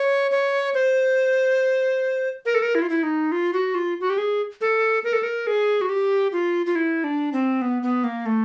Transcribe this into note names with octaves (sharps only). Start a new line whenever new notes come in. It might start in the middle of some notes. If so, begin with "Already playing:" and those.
Already playing: C#5
C#5
C5
A#4
A4
A#4
E4
F4
E4
D#4
F4
F#4
F4
F#4
G4
G#4
A4
A#4
A4
A#4
G#4
F#4
G4
F4
F4
E4
D4
C4
B3
B3
A#3
A3